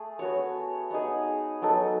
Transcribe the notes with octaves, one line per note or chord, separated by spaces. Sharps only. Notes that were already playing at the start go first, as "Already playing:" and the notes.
Already playing: A3 G#4
B3 F#4 C#5
B3 D#4 G#4
F#3 B3 D#4 A4